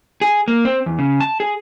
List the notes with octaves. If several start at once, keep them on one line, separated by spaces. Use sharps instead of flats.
G#4
A#3
C4
E2
C#3
A5
G#4